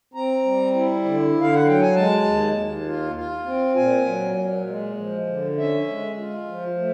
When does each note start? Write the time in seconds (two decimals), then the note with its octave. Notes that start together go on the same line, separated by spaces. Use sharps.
0.14 C4 A#5
0.44 G3
0.74 E4
1.04 D3
1.35 D3
1.41 F5
1.54 F#5
1.65 F#3 G5
1.81 G#5
1.95 G#3 A5
2.25 D#2
2.56 D#2
2.86 F4
3.16 F4
3.46 C4
3.76 A#2 G#5
4.06 F#3
4.37 A#2
4.67 G#3
4.97 F3
5.27 D3
5.57 C#4 E5
5.88 G#3
6.18 F4
6.47 F3
6.77 A3